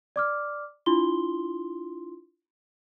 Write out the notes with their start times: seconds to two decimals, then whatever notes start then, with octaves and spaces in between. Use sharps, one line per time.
0.16 D5 D6 F6
0.86 D4 E4 F4 C6 G7